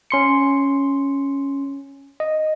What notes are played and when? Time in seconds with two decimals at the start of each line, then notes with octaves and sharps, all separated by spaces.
0.11 C#4 C6 C#7
2.20 D#5